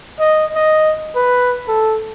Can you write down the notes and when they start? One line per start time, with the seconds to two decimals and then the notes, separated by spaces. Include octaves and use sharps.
0.20 D#5
0.56 D#5
1.16 B4
1.68 A4